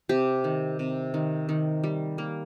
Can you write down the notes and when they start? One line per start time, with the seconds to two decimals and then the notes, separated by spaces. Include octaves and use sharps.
0.09 C3 G4
0.44 D#3
0.79 C3
1.14 D#3
1.49 D#3
1.84 G3
2.18 A#3